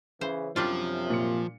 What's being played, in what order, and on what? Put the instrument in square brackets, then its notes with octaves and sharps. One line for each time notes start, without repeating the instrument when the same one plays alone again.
[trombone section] C#3 E3 [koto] C5
[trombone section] F#2 C3 [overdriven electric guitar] F3 [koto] G3 D4 F4
[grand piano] A#2 C#7